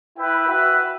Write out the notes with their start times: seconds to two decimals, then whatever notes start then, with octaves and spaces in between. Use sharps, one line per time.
0.16 E4 B4 E5 G5
0.47 F#4 B4 E5